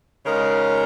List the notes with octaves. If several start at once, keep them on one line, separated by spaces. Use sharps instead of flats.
C#3 G#3 D#4 A#4